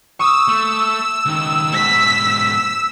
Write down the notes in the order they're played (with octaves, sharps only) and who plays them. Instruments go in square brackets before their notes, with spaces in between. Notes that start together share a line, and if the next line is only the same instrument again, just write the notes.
[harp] C#6 D#6 [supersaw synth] E6
[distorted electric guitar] A3
C#2 D#3
[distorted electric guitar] G#2 B2 [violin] B6